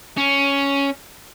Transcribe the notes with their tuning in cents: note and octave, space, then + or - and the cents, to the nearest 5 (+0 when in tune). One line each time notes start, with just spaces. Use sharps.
C#4 +5